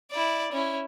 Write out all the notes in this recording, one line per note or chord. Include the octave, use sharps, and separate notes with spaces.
E4 D5
C#4 E4